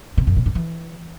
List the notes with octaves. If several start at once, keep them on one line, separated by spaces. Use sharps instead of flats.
C3
F#2
B2
G2
E3